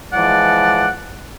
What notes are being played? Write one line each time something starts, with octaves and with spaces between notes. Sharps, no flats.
E3 F3 G#3 D5 F#5